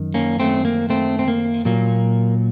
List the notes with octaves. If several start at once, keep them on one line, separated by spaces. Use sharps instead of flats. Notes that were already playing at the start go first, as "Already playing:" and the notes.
Already playing: F#2 D#3
A#3 C#4
A3 C4
A#3
A3 C4
C4
A#3
A#2 F#3 A#3